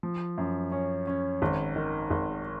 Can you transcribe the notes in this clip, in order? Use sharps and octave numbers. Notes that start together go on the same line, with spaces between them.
F3
F#2
C#4
C#4
G#1
D#3
G#1